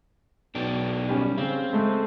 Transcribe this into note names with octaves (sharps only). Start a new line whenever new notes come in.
B1 B2 D4 G5
G3 C#4
C#3 C4
G#3 A3